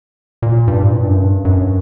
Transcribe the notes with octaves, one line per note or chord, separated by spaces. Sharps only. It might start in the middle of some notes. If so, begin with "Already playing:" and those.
A#2
G2
A#2
G2
F#2
G2
F#2